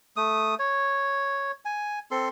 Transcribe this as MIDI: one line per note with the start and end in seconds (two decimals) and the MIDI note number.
0.17 0.55 57
0.17 0.55 87
0.59 1.52 73
1.65 1.99 80
2.11 2.29 60
2.11 2.29 69
2.11 2.29 84